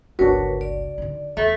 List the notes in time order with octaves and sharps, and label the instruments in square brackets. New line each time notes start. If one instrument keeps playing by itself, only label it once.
[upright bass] G1 C#2 [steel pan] D4 F#4 [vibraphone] A#4 B4 C#5
[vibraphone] D5
[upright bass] D3 D#4
[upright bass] E2 [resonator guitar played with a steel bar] A3